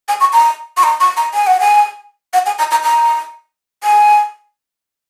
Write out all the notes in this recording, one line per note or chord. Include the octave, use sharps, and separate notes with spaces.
G#5
C#6
A#5
C#6
A#5
C#6
A#5
G#5
F#5
G#5
F#5
G#5
A#5
A#5
A#5
G#5